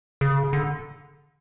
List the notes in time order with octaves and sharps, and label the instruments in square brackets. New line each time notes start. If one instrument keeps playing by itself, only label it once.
[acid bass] C#3
D3